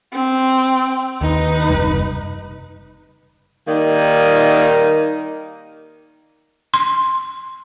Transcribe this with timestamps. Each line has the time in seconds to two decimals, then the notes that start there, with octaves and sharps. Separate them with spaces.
0.13 C4
1.21 D#2 D#4 B4
1.70 F#1 C3 G3
3.68 D#3 G3 A#3 D#4
6.74 C6